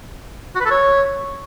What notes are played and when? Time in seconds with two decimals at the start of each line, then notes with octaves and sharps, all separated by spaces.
0.55 F#4
0.60 B4
0.66 A4
0.71 C#5